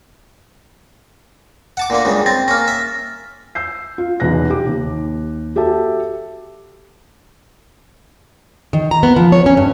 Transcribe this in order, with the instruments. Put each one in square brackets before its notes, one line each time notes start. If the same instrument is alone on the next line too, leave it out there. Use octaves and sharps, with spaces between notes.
[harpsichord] F#5 A5 D6
A#2 D3 A#3
C#2 G2 C#3
[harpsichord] C4 [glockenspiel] A6 A#6
[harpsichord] A#3 C#4 [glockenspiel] F6 A#6
[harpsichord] E5
[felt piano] E6 G6 C7
F4
B1 E2 F#6 A#6
G4 D6
D#2
F#4 G4 A4 E5 A5
[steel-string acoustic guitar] D#3
A#5
B3
F3
C#5
C#4
G2